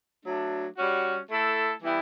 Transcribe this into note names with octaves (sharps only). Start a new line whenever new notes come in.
F#3 A3 D4
G3 C#4 F#4
A3 E4 A4
E3 G3 B3 E4 G4